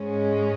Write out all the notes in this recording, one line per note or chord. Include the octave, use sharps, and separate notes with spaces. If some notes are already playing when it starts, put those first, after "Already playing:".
Already playing: G#2 G#3 C#4